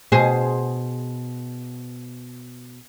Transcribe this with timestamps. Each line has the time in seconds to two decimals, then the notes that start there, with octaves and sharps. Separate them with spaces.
0.12 B2 G#4 C5